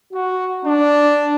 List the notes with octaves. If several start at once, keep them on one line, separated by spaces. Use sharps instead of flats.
F#4
D4